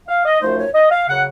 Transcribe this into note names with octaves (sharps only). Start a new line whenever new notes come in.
F5
D#5
F#2 F3 A3 D#4 C5
C#5
D#5
F5
C#3 F#3 F#5